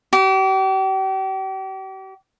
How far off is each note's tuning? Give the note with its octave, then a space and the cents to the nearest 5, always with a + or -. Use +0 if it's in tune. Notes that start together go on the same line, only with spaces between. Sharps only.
G4 -40